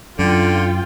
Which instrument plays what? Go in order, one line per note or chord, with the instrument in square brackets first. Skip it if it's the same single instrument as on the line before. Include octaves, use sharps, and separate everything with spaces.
[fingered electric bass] F#2 [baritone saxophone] D3 [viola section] F4 G5